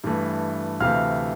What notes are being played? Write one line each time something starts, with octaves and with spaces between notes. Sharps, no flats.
G2 E3 A3
D2 C3 E3 A3 F5 F6